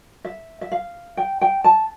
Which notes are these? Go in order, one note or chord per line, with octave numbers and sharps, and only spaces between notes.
E5
E5
F5
G5
G5
A5